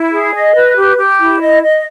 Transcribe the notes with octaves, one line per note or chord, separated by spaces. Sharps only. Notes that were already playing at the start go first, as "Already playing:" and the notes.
Already playing: E4
G#4
D#5
B4
G4
G4
E4
D#5
D#5